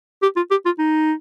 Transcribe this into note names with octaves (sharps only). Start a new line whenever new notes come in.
G4
F4
G4
F4
D#4